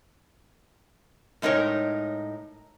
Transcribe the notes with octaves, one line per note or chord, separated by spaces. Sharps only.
A2 G#3 D#4 A#4 C#5